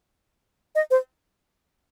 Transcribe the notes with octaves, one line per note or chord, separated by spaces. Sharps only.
D#5
C5